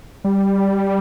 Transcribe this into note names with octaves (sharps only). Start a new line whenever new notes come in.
G3